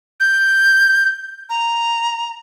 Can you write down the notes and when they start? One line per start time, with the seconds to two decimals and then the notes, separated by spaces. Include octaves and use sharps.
0.20 G6
1.50 A#5